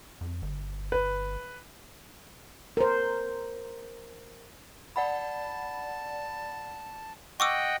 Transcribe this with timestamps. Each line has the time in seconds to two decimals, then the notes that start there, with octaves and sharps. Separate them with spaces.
0.21 F2
0.42 G1
0.92 B4
2.77 A#4 C5
4.96 D5 F#5 A5 B5
7.40 D#5 F#5 G5 C#6 D6 E6